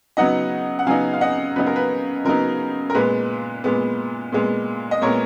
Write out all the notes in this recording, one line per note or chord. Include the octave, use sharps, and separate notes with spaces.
C#3 F#3 B3 D#4 D#5 F#5
F#5
C#3 F#3 B3 D#4 F5 G#5
F5
D#5 F#5
C#3 F#3 B3 D#4 B4
A#4
B4
C#3 F#3 B3 D#4 A#4
A#4
A#2 G#3 B3 B4
A#2 G#3 B3
A#2 G#3 B3
D#5
A#2 G#3 B3 A#4 C#5